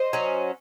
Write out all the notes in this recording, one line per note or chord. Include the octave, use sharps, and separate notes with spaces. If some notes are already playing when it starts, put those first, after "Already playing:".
Already playing: C5 D#5
F#3 C#4